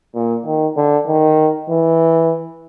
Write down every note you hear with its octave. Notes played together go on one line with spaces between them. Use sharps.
A#2
D#3
D3
D#3
E3